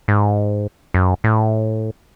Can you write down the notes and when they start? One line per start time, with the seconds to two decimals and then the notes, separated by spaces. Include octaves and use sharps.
0.08 G#2
0.94 F#2
1.24 A2